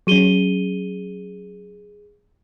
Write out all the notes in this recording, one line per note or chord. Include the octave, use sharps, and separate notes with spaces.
F#3 C#4 G#4 D#7 G7